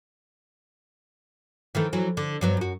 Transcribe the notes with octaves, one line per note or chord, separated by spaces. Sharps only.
D#3 E3 A3
E3 F#3
D3
G2 F#3 B3
F#2 F#4